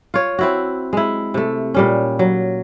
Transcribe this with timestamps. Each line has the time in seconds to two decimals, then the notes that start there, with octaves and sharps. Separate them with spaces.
0.14 F4 C#5
0.39 C4 E4 F#4
0.93 G#3 E4
1.34 C3 A3
1.74 A#2 G3 C#4
2.19 F#3